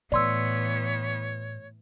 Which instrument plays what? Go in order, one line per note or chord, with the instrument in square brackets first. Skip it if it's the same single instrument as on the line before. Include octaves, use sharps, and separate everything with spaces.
[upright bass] A2 [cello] E3 B3 [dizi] C#5 [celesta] D5 C6 E6